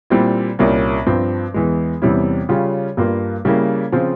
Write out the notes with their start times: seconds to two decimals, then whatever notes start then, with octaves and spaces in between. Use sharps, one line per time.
0.10 A#2 G3 C4 E4
0.59 C2 A#2 G3 A#3 C#4
1.07 G2 F3 C4
1.54 E2 E3 G#3
2.02 E2 C3 G3 C#4 E4
2.49 C#3 G3 C#4 F4
2.97 G2 G3 A#3 F4
3.45 C#3 G3 A#3 E4
3.92 C#3 F3 C4 F4